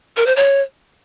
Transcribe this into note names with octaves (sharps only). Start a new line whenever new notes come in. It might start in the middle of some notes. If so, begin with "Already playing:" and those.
A#4
C5
C#5